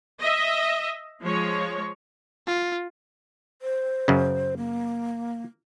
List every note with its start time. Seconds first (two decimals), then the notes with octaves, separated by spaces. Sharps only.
0.19 D#5 E5
1.22 F3 G#3 C#5
2.47 F4
3.62 C5
4.08 F#2 C#3
4.57 A#3